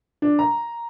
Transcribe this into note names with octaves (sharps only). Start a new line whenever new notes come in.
D4
A#5